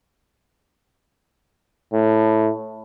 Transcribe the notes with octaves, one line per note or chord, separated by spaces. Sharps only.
A2